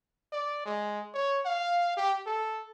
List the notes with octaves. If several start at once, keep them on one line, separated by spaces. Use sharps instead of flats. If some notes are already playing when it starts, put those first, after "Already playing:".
D5
G#3
C#5
F5
G4
A4